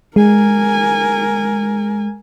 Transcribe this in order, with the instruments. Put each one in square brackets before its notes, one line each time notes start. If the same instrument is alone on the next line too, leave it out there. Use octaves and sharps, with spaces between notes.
[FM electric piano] G#3 [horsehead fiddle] A#4 G#5